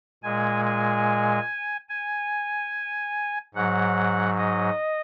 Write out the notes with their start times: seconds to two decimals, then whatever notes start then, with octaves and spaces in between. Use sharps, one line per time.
0.23 A#2 G#3 G#5
0.65 G#5
1.89 G#5
3.54 G#2 F#3 F#5
4.38 D#5